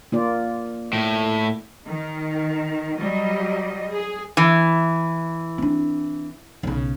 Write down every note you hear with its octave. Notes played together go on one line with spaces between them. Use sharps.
A#3 F4 D5
A2
D#3
F#3 G3 D#5
G#4
E3
C4 D4
B1 C#3